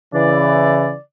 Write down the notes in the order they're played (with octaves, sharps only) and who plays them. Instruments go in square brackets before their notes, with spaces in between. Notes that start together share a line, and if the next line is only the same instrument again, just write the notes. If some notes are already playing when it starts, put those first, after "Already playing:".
[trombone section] C#3 E3 [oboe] D5